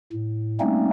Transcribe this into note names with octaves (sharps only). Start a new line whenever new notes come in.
A2
G3 A3 A#3 C4 C#4 D#4